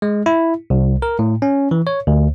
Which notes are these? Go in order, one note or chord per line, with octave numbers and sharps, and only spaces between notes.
G#3
E4
C2
A#4
A2
C#4
E3
C#5
D2